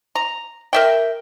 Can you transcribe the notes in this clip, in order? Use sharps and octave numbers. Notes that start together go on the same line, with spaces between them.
A#5
A#4 E5 G5